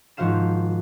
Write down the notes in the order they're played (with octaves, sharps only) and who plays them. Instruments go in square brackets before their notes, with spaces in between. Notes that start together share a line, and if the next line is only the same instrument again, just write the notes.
[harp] G#1 F3 F#4 C5 F5 E7